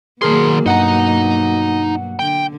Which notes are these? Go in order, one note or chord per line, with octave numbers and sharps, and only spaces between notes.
B2 D#3 F#3 A#3 G#4 A#4 C6
G2 D#4 F#5 A#5
D3 G5